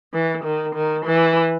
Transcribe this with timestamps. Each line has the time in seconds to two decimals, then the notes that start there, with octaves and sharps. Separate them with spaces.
0.13 E3
0.44 D#3
0.75 D#3
1.06 E3